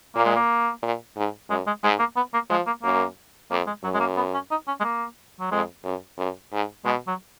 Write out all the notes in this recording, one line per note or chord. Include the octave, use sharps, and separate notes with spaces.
A#2 A#3
G#3
A#3
A#2
G#2
F#2 G#3
G#3
G#2 G#3
A#3
B3
A#3
F3 G#3
A#3
F#2 A#3
F2 A#3
G#3
F#2 F#3
G#3
A#3
B3
C#4
D#4
C#4
G#3
A#3
F#3
F2 G#3
F#2
F#2
G#2
B2 G#3
F#3